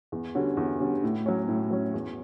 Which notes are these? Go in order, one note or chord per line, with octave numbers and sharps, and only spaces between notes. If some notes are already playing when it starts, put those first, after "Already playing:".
E2
D3 G3 C#4 F#4
E2
D3 G3 C#4 F#4
A2
F#3 C#4
A2
F#3 C#4
E2